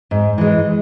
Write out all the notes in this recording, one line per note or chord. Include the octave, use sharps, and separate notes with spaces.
G#2
E3 G#3